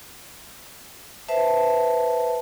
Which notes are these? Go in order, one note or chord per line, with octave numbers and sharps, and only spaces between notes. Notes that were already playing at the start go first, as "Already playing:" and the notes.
B4 C5 E5 A5